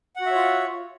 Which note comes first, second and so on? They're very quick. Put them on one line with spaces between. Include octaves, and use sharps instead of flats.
F#5 F#4 E5 C#5 F4